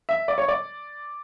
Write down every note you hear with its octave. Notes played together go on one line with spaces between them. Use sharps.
E5
D5
C#5
D5